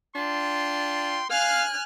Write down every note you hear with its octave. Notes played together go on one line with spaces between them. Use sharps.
D4 F4 G5 C6
F5 G#5 F6 F#6